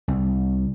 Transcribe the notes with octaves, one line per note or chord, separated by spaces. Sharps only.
C2